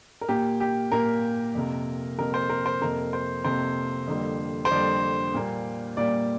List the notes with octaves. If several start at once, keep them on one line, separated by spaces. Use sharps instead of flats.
A#4
A#2 A#3 G4
G4
A#2 A#3 A#4
F2 C3 A#3
F2 C3 A#3 A#4
C5
A#4
C5
F2 C3 A#3 A#4
C5
F2 C3 A#3 C5
F2 D3 G3 A#3
C5
F2 D3 G3 A#3 D5
A#2 G3 A#3
A#2 G3 A#3 D5